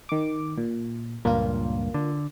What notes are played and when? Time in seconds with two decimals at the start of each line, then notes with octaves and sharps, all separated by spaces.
0.09 D#3 D6
0.58 A#2
1.25 C#2 G2 A#2 A#3 F4
1.94 D3